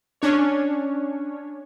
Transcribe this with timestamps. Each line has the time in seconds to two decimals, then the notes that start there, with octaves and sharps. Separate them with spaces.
0.22 C#4 D4 C#5